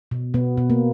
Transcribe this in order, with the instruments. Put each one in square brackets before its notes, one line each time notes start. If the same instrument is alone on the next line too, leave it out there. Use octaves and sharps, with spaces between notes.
[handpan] B2
B2 B3
B2
A#3